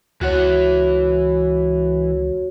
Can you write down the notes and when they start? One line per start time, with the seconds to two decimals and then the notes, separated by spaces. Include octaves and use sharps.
0.21 C#2 E3 F#4 C#5 F#5